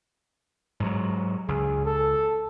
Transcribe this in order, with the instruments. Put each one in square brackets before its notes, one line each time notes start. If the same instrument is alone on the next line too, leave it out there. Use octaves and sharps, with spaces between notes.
[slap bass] G#2 F#3
[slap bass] C#2 [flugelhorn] G#4
[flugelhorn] A4